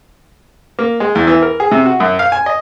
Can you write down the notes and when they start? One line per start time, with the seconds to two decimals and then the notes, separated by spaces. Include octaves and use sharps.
0.79 A#3
1.00 G#3
1.15 E2
1.27 E3
1.42 A#4
1.60 G#4
1.71 C3
1.86 F#4
2.00 F#2
2.19 F5
2.32 G#5
2.46 D#5